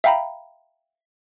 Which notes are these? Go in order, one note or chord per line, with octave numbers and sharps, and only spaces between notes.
E5 F5 G5 A#5 B5